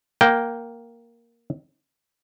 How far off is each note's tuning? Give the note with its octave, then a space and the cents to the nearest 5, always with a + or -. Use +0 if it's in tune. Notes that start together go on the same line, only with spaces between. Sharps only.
A#3 +0 G5 -10